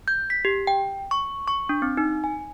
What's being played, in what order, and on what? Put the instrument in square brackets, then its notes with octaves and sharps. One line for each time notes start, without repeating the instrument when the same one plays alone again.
[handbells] G6
B6
G4
G5
C#6
C#6
D4
C4
D#4
G#5